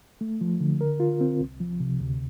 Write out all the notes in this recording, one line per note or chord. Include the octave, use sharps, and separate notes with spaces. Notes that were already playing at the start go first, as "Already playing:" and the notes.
A3
F3
D3
A#4
F4
C4
C2
F3
C3
D2